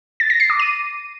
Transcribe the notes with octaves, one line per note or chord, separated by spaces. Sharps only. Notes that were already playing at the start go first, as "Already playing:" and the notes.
A6
A#6
C7
D6
D#7